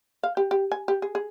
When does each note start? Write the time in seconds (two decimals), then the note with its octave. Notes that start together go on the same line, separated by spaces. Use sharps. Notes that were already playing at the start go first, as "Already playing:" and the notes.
0.23 F5
0.37 G4
0.51 G4
0.72 G#5
0.88 G4
1.02 G#4
1.15 G#4